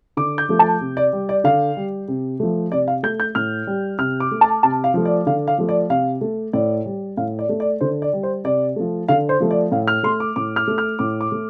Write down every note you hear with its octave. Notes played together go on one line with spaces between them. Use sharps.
D3 D6
G6
F3 A3
A5
C3
D5
G3
D5
D3 F5
G3
C3
F3 A3
C3 D5
F5
A3 G6
G6
A2 F6
G3
C3 F6
D6
A3
A5
C3 A5
F5
F3 A3
D5
D3 F5
F5
F3 A3
D5
C3 F5
A3
A2 D5
G3
A2 F5
D5
A3
D5
D3 C5
D5
G3
C5
C3 D5
F3 A3
D3 F5
C5
F3 A3
D5
A2 F5
F6
A3 C6
D6
A2 D6
F6
A3
F6
A2 D6
D6
A3